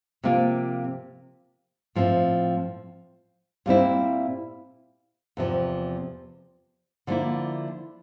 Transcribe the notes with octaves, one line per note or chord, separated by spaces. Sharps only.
C3 F3 A#3 F4
A2 F3 C4
A#2 G3 C4 E4
E2 C3 F3
D3 F3 A#3 E4